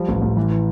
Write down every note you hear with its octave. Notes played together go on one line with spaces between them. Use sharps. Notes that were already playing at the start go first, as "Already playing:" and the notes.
Already playing: F3 G3
A1
A1
E3
E3